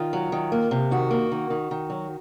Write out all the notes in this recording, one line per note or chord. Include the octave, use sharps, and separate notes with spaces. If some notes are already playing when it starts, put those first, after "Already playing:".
Already playing: D#3 F4
F#3
D#3
A#3
C3
D#3 F#4
A#3
D#3
D#3
D#3
F#3